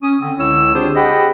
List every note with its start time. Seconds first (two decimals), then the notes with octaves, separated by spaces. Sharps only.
0.03 C#4 D#6
0.21 D3 C4
0.38 C#2 D3 E4 C#5 E6
0.74 C4 D4 F4 G4 G#4 C5
0.96 G4 G#4 D#5 F#5 G5 B5